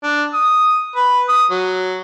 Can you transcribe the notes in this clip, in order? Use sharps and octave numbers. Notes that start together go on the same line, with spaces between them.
D4
D#6
B4
D#6
F#3